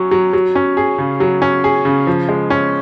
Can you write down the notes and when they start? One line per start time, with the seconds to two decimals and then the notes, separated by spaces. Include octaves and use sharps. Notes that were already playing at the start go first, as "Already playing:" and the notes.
Already playing: F#3 C#4
0.11 F#3
0.33 F#3
0.55 C#4
0.77 G#4
0.98 C#3
1.20 F#3
1.42 C#4
1.64 G#4
1.85 C#3
2.07 F3
2.29 G#3
2.50 C#4